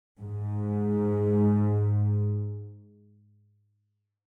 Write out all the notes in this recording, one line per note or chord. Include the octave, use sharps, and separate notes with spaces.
G#2